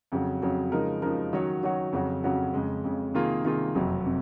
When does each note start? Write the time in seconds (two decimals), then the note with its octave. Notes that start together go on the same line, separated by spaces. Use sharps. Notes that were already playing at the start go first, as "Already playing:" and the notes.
0.12 F2 C#3 F#3
0.42 F2 C#3 F#3
0.72 C#3 F3 G#3 D#4 A#4
1.02 C#3 F3 G#3 D#4 A#4
1.33 D#3 F#3 C#4 F#4 C#5
1.63 D#3 F#3 C#4 F#4 C#5
1.92 F2 C#3 F#3 C#4 F#4
2.24 F2 C#3 F#3 C#4 F#4
2.54 F2 C#3 G#3
2.84 F2 C#3 G#3
3.14 C3 D#3 A#3 F4 G#4
3.44 C3 D#3 A#3 F4 G#4
3.75 F#1 F2 C3 F#3
4.06 C3